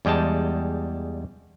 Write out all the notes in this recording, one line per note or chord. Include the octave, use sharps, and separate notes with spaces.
E2 G3 G#3 G5 A5